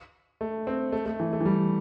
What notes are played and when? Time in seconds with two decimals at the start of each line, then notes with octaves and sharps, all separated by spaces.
0.41 A3
0.67 C4
0.92 A3
1.06 A3
1.20 E3
1.33 A3
1.40 E3
1.45 G3